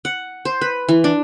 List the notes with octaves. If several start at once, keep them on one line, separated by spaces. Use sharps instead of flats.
F#5
C5
B4
E3
D4